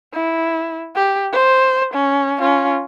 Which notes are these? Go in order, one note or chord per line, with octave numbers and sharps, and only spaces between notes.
E4
G4
C5
C#4
C#4 F4